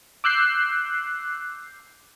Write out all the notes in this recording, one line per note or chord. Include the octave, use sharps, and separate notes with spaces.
D6 E6 F#6 G6 C7